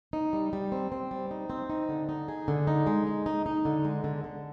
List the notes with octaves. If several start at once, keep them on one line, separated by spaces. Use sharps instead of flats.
D#4
G3
G3
C4
C4
G3
D#4
C4
D#4
D3
D#4
G#4
D3
D#4
G#3
D#4
D#4
D#4
D3
G#3
D3
D3